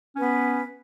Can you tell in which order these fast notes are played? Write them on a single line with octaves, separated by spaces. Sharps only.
C#4 B4 B3